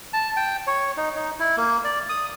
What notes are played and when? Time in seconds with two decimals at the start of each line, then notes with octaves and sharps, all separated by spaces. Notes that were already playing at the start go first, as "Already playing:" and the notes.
0.13 A5
0.37 G5
0.67 C#5
0.97 D#4
1.15 D#4
1.39 E4
1.57 A#3
1.84 D5
2.09 D#6